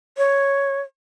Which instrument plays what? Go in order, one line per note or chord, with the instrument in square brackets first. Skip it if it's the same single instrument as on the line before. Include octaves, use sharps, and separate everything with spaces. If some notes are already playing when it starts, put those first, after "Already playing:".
[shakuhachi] C#5